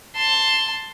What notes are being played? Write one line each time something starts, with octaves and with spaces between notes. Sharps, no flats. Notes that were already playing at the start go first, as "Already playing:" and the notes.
A5 C6